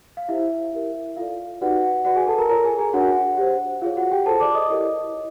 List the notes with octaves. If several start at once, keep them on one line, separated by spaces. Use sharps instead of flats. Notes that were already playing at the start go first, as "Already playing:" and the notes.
F5
E4 G4 C5 E5
E4 G4 A#4
F4 A4 D5 F5
D#4 F#4 G4 B4 D5 F#5
F#4 B4 D5 F#5
G#4 G#5
A4 A5
A#4 A#5
F4 A#4 C#5 A#5
G#4 G#5
G#4 G#5
D4 F#4 A#4 C#5 F#5
G4 C5
F4 G#4 C#5 F5
F#4 F#5
G4 G5
F4 G#4 A4 C5 A5
D5 D6
D#5 D#6
E4 G4 A#4 C#5
E4